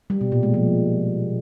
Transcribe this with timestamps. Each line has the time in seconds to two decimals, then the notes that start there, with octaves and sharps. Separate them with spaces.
0.10 G3
0.21 B2
0.32 A#2
0.43 G#3
0.54 F3